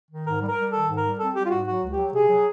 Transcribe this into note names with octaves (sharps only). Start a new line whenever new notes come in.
D#3
G#2 A#4
G3
A#4
G3
D#3 A4
G#2
A#4
G3
C4 A4
G3 G4
F4
G#2 F#4
F#3 F#4
C#2
G4
F#3
C3 G#4
F#3